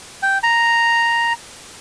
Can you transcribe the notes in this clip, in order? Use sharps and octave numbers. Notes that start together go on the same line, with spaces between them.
G5
A#5